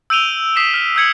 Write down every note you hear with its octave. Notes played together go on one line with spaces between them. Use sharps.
E6 G6 D7 D#7 F7 G7
D#6 B6 C7 D7 E7 F7
F6 B6
E6 G6 G#6 C#7 F#7